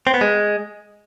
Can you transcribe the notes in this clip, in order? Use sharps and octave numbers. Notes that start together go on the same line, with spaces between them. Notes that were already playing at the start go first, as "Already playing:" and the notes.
C4
B3
G#3